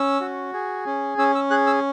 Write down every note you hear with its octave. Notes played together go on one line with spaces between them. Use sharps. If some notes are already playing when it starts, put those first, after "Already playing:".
Already playing: C#4 E6
F#4
G#4
C#4
C#4 E6
E6
G#4 F#6
E6